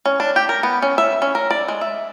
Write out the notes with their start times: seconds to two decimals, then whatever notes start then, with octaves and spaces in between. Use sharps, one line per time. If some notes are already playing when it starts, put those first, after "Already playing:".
0.05 C#4
0.20 D4
0.36 G4
0.49 A#4
0.63 B3
0.82 C#4
0.98 E5
1.22 C#4
1.35 A#4
1.51 D5
1.68 G#3
1.81 E5